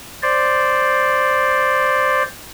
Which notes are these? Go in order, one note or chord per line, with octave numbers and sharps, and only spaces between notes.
C5 D5